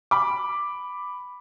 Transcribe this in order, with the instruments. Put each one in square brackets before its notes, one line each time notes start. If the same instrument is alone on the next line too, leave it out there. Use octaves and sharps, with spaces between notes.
[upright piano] B5 D6